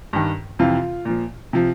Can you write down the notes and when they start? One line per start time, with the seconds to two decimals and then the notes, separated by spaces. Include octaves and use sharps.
0.13 G2 D#3
0.59 F2 C3 E3 F4
1.05 A#2 F3
1.53 C3 F3